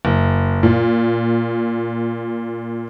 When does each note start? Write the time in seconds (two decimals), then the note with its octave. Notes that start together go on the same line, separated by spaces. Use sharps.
0.05 F#1
0.63 A#2